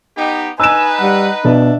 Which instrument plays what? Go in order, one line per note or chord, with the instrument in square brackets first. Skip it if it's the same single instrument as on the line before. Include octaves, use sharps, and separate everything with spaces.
[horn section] B3 D#4 G4
[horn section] D#4 B4 [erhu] G#5 [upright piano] E6 E7
[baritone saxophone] G3 [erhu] F#5
[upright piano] B2 [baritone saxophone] D4 [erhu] E5